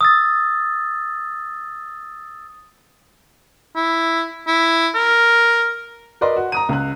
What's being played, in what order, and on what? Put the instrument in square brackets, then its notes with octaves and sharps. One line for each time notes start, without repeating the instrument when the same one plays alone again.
[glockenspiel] D#6 E6 A6
[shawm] E4
E4
A#4
[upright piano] A#4 B4 D5 D#5 C6
F#4
A#5 D#6 D#7
C#2 F#6